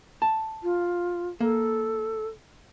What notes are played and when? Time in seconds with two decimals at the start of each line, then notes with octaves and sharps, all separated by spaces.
0.22 A5
0.63 F4
1.40 A#3 A4